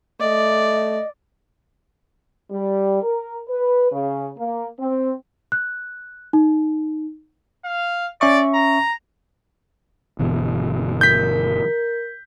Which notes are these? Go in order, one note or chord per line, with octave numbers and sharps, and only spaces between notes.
A3 D5 D#5
G3
A#4
B4
C#3
A#3
C4
F#6
D#4
F5
C#4 D5 E5 C#6
A#5
G1 B2 E3
A#4 G6 B6